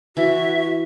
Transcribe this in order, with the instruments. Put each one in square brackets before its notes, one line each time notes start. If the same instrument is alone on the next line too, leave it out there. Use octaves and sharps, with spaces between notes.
[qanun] E3 [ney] F#4 [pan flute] E5